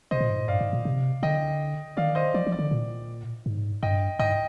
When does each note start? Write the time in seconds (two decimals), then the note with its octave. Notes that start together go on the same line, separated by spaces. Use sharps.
0.11 C3 C5 D#5
0.20 A#2
0.30 G#2
0.39 A#2
0.48 G2 D5 F5
0.61 G#2
0.73 A#2
0.85 C3
1.23 D3 D#5 G5
1.97 D#3 D5 F5
2.15 C5 D#5
2.34 F3 D5
2.47 F3
2.52 D5
2.59 D3
2.71 A#2
3.46 G#2
3.83 G2 D#5 G5
4.19 G#2 D#5 G5